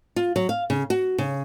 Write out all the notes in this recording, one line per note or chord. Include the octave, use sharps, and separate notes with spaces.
F4
F#3
F5
C#3
F#4
C#3